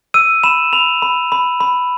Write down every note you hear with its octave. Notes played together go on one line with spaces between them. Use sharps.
E6 D#7
B5 E7
B5 F7
B5
B5
B5